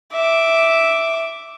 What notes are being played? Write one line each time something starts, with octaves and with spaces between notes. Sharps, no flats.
E5 D6